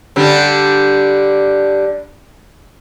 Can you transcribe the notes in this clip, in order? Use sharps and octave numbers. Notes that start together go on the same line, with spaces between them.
D3 G3 D4